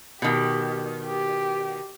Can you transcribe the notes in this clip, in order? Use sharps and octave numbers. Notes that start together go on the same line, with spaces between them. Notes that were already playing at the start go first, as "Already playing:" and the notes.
B2 D#3 G4
G4